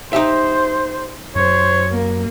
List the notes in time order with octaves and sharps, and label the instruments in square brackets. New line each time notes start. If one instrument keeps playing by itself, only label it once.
[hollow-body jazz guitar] D#4 G4 E5 [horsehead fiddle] C5
[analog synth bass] F#2 [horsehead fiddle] C5 [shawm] C#5
[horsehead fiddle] A#3